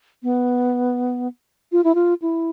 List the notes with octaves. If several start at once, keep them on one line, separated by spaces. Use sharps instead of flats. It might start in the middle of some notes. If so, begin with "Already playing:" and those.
B3
F4
E4
F4
E4